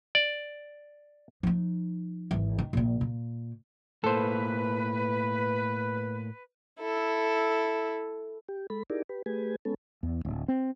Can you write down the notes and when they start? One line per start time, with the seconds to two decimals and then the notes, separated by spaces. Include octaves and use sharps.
0.15 D5
1.43 F3 D#4
2.31 G#1 E3
2.59 D#3
2.73 A#1 A#2
3.01 A#2
4.04 A2 A#3 A4 B4 C5
6.79 E4 A4
8.48 G4
8.70 G#3 A4 B5
8.90 D#4 E4 G4 G#4 A#4 D5
9.09 G4 B4
9.26 A3 G4 G#4 B4 G#5
9.65 G#3 B3 C#4 A4
10.03 E2
10.25 D1
10.48 C4